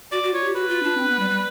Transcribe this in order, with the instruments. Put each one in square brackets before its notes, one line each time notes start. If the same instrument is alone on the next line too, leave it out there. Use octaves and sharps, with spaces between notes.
[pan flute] F#4 [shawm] D5
[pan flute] F#4
[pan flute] F4 [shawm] C#5
[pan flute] G4
[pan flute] F#4 [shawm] B4
[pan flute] F4
D4
C4
B3
G3
G3